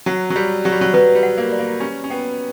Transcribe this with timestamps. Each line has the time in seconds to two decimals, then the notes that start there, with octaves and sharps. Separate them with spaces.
0.06 F#3 F#5
0.30 F#3
0.36 G3 D5
0.65 F#3 G4
0.72 G3
0.81 F#3
0.94 F#3 B4
1.15 G3
1.23 F#5
1.38 A#3
1.52 D5
1.59 A#3
1.80 C#4 G4
2.04 C#4
2.10 B3 G5